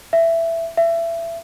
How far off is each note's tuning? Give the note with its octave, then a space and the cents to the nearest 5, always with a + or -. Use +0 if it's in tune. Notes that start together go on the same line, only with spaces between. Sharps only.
E5 +10
E5 +25